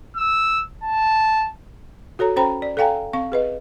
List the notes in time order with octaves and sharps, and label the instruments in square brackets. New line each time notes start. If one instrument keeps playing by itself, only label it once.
[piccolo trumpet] E6
A5
[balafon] F#4 A4 C#5 A#5
C#4 A4 C5 G5 A#5 B5
D5
A4 D5 F5 G5 G#5 A#5
C4 F5 C#6
G#4 B4 D#5